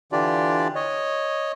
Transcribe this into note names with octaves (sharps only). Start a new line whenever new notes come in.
D3 E3 D4 F4 G4 D5
C#5 D#5